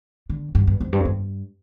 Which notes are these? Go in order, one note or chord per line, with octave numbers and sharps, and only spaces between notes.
D3
G2
G2
F2
G2
F2
G2